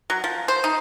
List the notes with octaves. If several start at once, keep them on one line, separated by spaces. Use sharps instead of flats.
F#3
F3
C5
D#4